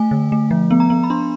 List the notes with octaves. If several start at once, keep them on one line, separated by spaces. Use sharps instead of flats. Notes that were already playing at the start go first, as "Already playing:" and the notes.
Already playing: A3 G#5
D3
A3
F3
B3
A#5
B3
B5
D4 C6